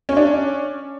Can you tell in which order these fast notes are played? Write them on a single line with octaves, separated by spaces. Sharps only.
C#4 C#5 D4